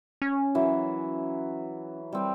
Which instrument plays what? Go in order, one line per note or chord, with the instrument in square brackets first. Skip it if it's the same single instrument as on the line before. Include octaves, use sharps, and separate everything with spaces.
[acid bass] C#4
[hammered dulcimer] E3 F#3
G3 C4 G4